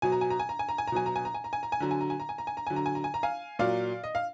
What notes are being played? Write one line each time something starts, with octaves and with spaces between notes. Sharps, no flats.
B2 F#3 G#5
A#5
G#5
A#5
G#5
A#5
G#5
A#5
G#5
A#5
B2 F#3 G#5
A#5
G#5
A#5
G#5
A#5
G#5
A#5
G#5
D3 F#3 A#5
G#5
A#5
G#5
A#5
G#5
A#5
G#5
A#5
D3 F#3 G#5
A#5
G#5
A#5
G#5
A#5
F5 G#5
A#2 F#3 D5 F5
D#5
F5